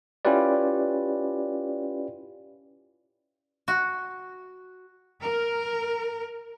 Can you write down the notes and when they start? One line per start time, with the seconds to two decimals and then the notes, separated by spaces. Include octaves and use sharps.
0.25 C#4 E4 F4 G4 B4 D5
3.68 F#4
5.21 A#4